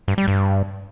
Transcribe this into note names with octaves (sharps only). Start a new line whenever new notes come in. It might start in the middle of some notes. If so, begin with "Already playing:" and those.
G2
G3
G2